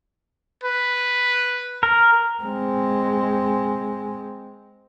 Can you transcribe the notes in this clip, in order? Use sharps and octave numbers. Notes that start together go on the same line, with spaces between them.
B4
A#4
G#3 C4